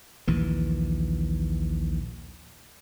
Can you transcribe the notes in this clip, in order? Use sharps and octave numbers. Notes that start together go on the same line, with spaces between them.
A#1 D#2 E3